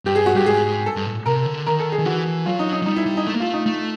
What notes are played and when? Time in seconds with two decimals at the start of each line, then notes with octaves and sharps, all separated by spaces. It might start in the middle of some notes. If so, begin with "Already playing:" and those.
0.05 G2 G4
0.15 G#4
0.26 F#4
0.35 G2 G4
0.46 G#2 G#4
0.86 A4
0.96 G2
1.06 A2
1.26 C3 A#4
1.46 D3
1.66 D#3 A#4
1.80 A4
1.92 G#4
1.99 D#3
2.06 E3 F#4
2.26 E3
2.46 F#3 F4
2.59 D#4
2.72 D#4
2.82 F#3
2.86 G3 D#4
2.96 E4
3.06 G3
3.17 D#4
3.27 A3
3.34 A#3
3.40 A3 F4
3.53 D#4
3.66 A3